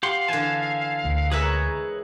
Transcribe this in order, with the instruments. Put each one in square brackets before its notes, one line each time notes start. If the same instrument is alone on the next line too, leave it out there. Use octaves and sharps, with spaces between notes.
[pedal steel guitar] G4 F#5 C6 [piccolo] F5
[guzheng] D3 E3 [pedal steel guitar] G#5 A5
[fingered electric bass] D2
[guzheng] G#3 A#4 E5 [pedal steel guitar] G#4 B4 C#5 [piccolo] A#5